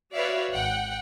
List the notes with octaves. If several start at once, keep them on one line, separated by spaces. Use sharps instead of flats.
F#4 B4 C#5 D5 E5 F5
G#1 F#5 G5